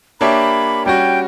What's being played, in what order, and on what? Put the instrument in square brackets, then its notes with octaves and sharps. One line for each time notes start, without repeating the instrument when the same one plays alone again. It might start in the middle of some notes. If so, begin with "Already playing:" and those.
[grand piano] A#3 D4 G4 C#5 E5 [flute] B5
[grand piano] G3 C#4 F#4 [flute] G5